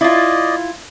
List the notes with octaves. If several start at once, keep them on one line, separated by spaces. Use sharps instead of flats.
E4 F4 D5 D#5